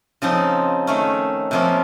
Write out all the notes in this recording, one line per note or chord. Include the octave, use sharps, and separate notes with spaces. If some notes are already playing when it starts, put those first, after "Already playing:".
C#3 F3 C4 D#4
D#3 A3 C#4
C3 F3 A#3 C#4